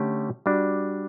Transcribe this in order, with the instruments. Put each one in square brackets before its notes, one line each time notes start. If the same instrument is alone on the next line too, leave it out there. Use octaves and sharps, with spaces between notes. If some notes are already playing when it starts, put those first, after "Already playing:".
Already playing: [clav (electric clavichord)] D3 A3 C#4 G4
G3 D4 F#4